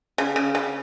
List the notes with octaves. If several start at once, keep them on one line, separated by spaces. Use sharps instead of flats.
C#3
C#3
C#3